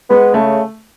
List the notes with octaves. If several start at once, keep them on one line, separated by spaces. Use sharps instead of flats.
G#3 B3
C#3 A3